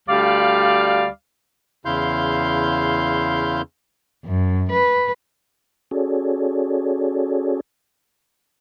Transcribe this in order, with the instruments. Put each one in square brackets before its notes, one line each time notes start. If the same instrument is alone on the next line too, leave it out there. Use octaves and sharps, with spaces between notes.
[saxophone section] D2 G3 D5 F5
[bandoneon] E2 C#3 E4 F5 C6 G6
[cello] F#2
B4
[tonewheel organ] C#4 F#4 G#4 A4 C#5 D5